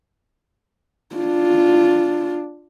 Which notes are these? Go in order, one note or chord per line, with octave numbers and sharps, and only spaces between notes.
D4 F4